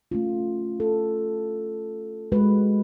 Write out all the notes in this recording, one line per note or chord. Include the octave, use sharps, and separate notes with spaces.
A3 C#4 F4
A4
G#3 F#4 B4